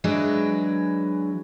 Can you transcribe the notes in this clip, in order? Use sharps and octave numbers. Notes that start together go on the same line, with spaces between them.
E3 F#3 G#3 D4 B4